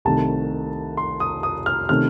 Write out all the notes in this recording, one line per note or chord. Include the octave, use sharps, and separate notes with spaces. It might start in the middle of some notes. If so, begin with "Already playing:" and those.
C2 C3 D#3 A3 A5
C6
D#6
D#6
F6
C3 D#3 A3 C#4 F6